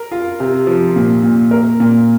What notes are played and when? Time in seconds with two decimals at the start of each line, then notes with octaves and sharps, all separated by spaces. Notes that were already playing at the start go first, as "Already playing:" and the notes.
Already playing: A#4
0.11 F4
0.40 C3
0.67 F3
0.96 A#2
1.23 A#2
1.51 A#4
1.80 A#2